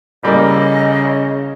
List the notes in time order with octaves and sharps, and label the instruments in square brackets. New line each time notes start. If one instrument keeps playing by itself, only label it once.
[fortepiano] A1 G3 A#3 [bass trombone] C#3 [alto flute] D#5